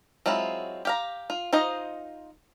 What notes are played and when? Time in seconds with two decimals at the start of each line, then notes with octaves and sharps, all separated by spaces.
0.26 F#3 G#3 C4 E4 F4
0.85 G4 F5 A#5
1.30 F4
1.53 D#4 F4 C5 D#5